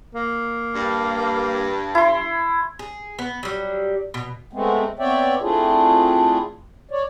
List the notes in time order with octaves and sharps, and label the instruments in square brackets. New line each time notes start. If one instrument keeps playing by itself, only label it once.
[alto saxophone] A#3
[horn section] G2
[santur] E4 C6
[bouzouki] G#4
B3
F#3 G3
B2
[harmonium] G#3 A3 B3 C4
B3 C4 C#5 D5 E5 G5
A3 C4 D4 E4 F4 G#4
C#5 D5